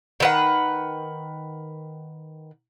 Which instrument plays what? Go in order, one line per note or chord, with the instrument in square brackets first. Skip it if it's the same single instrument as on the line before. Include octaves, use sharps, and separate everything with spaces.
[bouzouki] D#3 B4 F#5